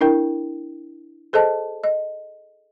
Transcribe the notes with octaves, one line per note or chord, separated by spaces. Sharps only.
D4 E4 A#4 G5
G#4 A4 C5 D#5 A5
D#5